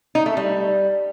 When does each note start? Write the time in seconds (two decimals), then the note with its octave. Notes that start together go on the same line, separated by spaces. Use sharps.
0.15 D#4
0.26 A3
0.37 G3